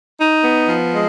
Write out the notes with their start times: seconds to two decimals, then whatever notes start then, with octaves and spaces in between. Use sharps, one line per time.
0.19 D#4
0.44 B3
0.68 F3
0.93 G#3